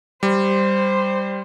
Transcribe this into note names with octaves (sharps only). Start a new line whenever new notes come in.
G3 C5